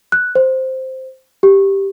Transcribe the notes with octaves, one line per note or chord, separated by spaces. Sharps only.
F#6
C5
G4